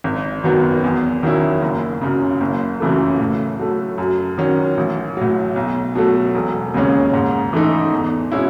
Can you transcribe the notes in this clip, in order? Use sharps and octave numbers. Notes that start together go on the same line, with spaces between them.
G#1
F#2 D#3 F#3 B3
E2
D#3 F#3 C#4 E4
F#1
F#2 C#3
F#1
F#2 C#3 E3 A3
A2
F#3 A3
F#2
D#3 F#3 C#4
A1
A2 F#3
B1
B2 F#3 A3
E1
D#2 C#3 G#3 C#4
G#2
E3 A3 D#4
E2
B2 G#3 C#4 E4